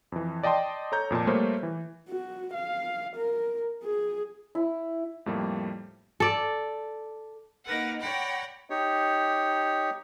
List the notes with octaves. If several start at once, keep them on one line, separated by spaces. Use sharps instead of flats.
F2 E3
D5 D#5 G5 A5 C6
A4 C#5 A#5 G6
F2 A#2 F3 A5
G3 A3 A#3 C5 C#5
E3
F#4
F5
A#4
G#4
E4
F2 A2 G3 A#3
A4 D5
A#3 D#4 A#4 B4 F#5
C#5 D5 F#5 G5 A#5 B5
D#4 G4 C#5